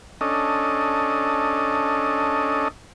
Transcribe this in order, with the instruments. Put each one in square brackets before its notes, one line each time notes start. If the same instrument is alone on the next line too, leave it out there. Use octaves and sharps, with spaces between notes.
[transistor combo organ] C#4 D4 A4 D#5